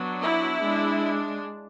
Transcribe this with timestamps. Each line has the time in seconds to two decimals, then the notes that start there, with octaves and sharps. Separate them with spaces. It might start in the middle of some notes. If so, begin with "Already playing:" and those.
Already playing: F#3 B3 D4
0.22 E4
0.61 G#3 D4